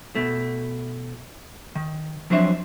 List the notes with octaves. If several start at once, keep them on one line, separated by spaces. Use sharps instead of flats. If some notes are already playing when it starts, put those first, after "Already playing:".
B2 A3
D#3
F3 F#3 C4 D4 E5